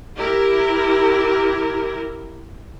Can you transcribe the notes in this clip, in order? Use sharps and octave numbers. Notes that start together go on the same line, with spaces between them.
E4 G4 A#4